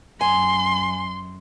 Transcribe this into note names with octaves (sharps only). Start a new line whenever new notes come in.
F#2 G#5 C6